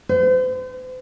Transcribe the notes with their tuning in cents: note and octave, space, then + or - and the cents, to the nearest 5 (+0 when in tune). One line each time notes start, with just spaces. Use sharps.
C5 -40